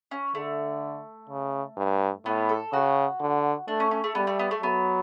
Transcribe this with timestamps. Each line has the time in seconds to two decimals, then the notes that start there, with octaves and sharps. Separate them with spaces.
0.11 C#4
0.35 D3 A3
1.30 C#3
1.77 G2
2.25 A2 B3
2.49 A4
2.73 C#3 F#4
3.21 D3
3.68 A3 D4
3.80 C#4
3.91 C#4
4.04 A3
4.15 G3 B3
4.27 A3
4.39 B3
4.51 A3
4.62 F#3 B3